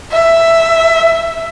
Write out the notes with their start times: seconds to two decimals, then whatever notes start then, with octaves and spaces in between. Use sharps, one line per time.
0.12 E5